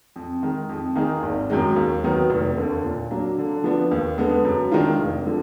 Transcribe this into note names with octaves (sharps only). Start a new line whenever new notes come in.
F2
D#3 G#3
F2
D#3 A#3 D#4 G#4
G#1
F#2 D#3 G#3
D#2
D#3 F#3 B3
F1
D#2 D3
A#2
F#3 A#3 D4
D3
F3 B3 D4
D#2
D3 G#3 B3
F#2
D#3 G#3 D4 F4
F1
D3 F3